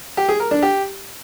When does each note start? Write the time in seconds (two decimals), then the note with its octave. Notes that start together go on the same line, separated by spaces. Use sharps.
0.17 G4
0.29 G#4
0.40 A#4
0.51 D4
0.62 G4